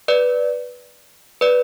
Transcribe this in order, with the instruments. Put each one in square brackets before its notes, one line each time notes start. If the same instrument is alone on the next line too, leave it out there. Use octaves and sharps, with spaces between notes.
[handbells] B4 D5
B4 D5